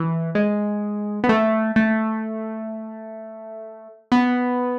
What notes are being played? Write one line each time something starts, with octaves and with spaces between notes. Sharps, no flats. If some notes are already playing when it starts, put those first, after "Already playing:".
Already playing: E3
G#3
B3
A3
A3
B3